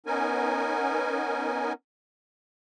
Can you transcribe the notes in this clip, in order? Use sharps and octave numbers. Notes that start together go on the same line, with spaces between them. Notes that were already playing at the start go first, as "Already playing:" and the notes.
B3 C#4 D#4 A#4 G#5